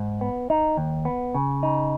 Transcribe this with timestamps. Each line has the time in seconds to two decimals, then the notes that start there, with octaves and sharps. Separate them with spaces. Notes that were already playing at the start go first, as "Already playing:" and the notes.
Already playing: G#2
0.21 B3
0.50 D#4
0.77 D#2
1.05 B3
1.34 C#3
1.63 D#4